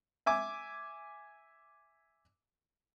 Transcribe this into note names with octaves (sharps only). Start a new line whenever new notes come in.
E5 G#5 D6